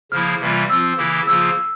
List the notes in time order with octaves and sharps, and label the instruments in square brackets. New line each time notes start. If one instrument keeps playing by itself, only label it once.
[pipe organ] C#3 F3 A#3 E4 [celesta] F6
[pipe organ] C3 E3 G3 A#3 F4
[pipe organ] F3 C4 F4 [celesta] E6
[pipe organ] C#3 E3 A#3 E4 G4
[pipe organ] C#3 F3 A#3 F4 [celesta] E6